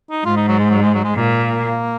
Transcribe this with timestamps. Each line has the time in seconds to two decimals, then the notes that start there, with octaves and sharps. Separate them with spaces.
0.10 D#4
0.25 G#2 F4
0.37 D#4
0.48 F#3
0.59 G#3
0.71 F#3
0.82 G#3
0.94 F#3
1.04 G#3
1.16 A#2 A#3